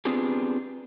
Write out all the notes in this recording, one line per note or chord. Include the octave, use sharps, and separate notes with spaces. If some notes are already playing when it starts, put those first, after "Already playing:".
B3 C4 D4 F4 G4 G#4